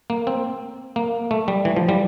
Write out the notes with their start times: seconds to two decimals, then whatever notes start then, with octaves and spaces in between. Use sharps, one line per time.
0.10 A#3
0.27 C4
0.96 A#3
1.31 A3
1.48 G3
1.65 E3
1.76 F3
1.89 G3